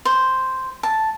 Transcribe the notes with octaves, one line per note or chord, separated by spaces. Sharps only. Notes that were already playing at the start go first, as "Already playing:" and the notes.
C5
A5